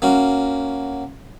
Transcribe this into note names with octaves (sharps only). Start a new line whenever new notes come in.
A#3 C#4 F#4